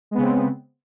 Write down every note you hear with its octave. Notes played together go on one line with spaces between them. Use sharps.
C#3 G#3 B3 C4